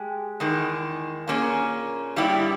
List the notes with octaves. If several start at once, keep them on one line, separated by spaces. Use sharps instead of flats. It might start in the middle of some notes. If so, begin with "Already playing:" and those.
Already playing: G#3 G4
E2 D#3 G#3
A#2 A#3 C#4 G#4
G2 G3 B3 E4 G4